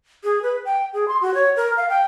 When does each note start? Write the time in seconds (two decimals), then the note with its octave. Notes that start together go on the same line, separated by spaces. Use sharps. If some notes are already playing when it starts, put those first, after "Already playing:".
0.24 G#4
0.43 B4
0.65 G5
0.93 G#4
1.08 C6
1.21 F#4
1.34 C#5
1.56 A#4
1.77 F5
1.89 G5